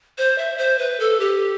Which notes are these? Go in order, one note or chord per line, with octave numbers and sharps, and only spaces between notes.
C5
E5
C5
B4
A4
G4